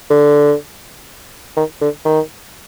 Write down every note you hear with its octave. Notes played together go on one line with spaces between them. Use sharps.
D3
D#3
D3
D#3